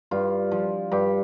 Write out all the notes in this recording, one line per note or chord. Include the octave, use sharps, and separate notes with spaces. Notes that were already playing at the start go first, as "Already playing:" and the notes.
G2 F4
F3
G2 G4